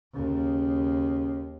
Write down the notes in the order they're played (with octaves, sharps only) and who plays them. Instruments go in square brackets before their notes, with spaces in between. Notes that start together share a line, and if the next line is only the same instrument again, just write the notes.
[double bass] D#2 [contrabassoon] C#3